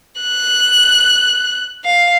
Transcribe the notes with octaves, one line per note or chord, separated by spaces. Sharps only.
F#6
F5